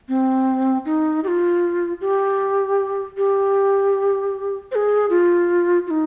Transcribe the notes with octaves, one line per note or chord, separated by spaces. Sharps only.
C4
D#4
G4
F4
G4
G4
C5
G#4
F4
F4
D#4